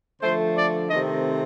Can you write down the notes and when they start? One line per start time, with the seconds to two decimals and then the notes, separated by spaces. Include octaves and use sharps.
0.21 D3 F3 A3 C5
0.56 D5
0.90 C3 D#3 A3 C4 D#5